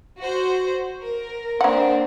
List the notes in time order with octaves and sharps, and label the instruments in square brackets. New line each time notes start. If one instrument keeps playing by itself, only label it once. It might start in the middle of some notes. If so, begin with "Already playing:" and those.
[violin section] F#4 C5
A#4
[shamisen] A#3 F#5 [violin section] C4 D4 C5